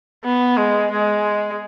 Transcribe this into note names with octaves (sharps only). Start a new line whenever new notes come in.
B3
G#3
G#3